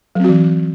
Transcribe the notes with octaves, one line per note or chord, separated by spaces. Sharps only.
E3 F#3 C4 F#4